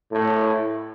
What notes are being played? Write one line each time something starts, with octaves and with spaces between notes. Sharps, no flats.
A2